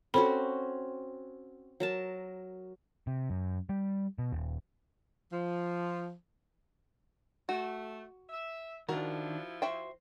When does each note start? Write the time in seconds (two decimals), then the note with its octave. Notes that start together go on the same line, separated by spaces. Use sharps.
0.14 C4 C#4 F#4 A4 B5
1.80 F#3 A#4 A5
3.07 C3
3.30 F#2
3.69 G3
4.18 B2
4.33 D#1
5.32 F3
7.49 A3 F#4
8.29 E5
8.89 D#3 F3 D4 E4 F#4 A#4
9.62 F#4 C5 E5 G5